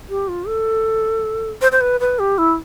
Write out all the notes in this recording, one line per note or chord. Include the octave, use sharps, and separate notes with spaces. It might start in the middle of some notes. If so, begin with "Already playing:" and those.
G4
F4
A4
C5
C5
B4
B4
G4
E4